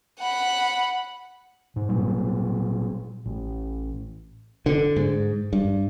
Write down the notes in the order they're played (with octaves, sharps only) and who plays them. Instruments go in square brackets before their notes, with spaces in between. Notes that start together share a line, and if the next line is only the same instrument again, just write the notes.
[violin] F#5 B5
[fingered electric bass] G#2
A#2 F#3 G3
A1
D3
G#2
G2